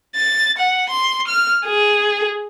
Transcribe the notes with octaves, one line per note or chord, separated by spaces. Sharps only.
A6
F#5
C6
F6
G#4